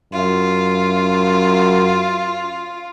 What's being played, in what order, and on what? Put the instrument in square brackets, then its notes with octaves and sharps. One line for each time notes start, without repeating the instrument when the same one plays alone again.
[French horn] F#2 [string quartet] F4